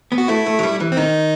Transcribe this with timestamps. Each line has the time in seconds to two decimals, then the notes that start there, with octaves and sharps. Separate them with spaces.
0.12 B3
0.18 F#4
0.28 A3 E4
0.46 A3
0.59 F#3
0.63 G3
0.80 E3
0.92 C4
0.97 D#3 D#4